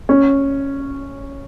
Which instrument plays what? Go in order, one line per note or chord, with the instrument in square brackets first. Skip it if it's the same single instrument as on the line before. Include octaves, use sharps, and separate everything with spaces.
[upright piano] C#4